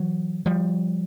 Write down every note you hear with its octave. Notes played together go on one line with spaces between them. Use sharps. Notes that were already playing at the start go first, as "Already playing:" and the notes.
Already playing: E3 F#3
F3 G3